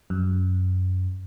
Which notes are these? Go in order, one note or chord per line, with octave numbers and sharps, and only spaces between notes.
F#2